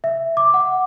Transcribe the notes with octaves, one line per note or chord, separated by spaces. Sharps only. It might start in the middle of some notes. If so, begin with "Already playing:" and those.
E5
D6
F#5